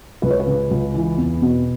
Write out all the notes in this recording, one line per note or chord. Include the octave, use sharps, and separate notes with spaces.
C#2 B4
C#5
B4
C#3
C#2
E3
E2
B2